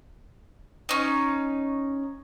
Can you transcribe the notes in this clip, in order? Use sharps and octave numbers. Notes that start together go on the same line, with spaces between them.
C#4 D#4